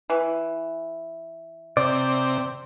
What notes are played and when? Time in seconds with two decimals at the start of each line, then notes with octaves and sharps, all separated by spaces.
0.10 E3
1.77 C3 D5